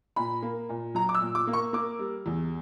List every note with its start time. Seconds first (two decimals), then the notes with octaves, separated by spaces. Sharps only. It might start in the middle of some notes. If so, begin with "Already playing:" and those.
0.16 A#2 B5
0.43 A#3
0.69 A#2
0.95 F#3 A#5
1.09 D6
1.15 E6
1.21 A#2
1.35 D6
1.47 A#3
1.53 C#6
1.73 A#3 D6
1.99 G3
2.26 E2